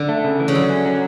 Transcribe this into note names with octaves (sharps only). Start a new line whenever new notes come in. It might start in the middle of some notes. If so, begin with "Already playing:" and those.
Already playing: D3
A3
C#3
E3
C#3
D3 F#3
C#4
F#3